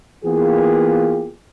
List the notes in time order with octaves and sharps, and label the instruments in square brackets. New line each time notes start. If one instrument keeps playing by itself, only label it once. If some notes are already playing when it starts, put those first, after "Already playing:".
[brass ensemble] E3 A#3 B3 F4 G4 G#4